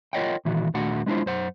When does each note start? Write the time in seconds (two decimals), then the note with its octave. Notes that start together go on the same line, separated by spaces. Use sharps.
0.13 F4 A#4 C#5 D#5 F#5 G5
0.45 A#2 D#3 E3 F#4
0.74 D#2 A#2 A3 D4 F#4 F#5
1.06 G#3 B3 D4 E4 F4 C5
1.26 F#2 C5 F#5